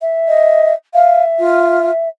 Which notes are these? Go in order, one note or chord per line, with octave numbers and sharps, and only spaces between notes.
E5
D#5
E5 F5
F4